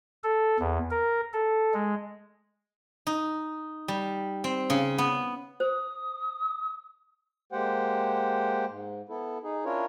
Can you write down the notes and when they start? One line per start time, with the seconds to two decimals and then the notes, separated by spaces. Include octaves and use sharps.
0.24 A4
0.60 E2
0.91 A#4
1.33 A4
1.74 G#3
3.07 D#4
3.88 G3
4.44 C4
4.70 C#3
4.98 B3
5.60 C5 D#6
7.52 G#3 A#3 G4 C5 F#5 G5
8.68 G#2
9.09 B3 E4 A4
9.43 D#4 G#4
9.65 C#4 D4 E4 F4 A#4 C#5